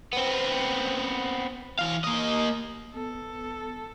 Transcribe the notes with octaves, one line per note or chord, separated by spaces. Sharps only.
B3 C4
E3 F5
A#3 D#5
B3 A4